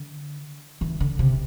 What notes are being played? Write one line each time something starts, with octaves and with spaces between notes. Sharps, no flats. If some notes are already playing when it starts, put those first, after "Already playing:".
Already playing: D3
E3
D3
C3